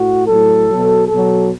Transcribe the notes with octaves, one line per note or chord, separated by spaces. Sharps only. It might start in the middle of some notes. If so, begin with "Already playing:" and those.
Already playing: A2 F#4
A2 F#3 A4
B2 F#3
B2 F#3 A4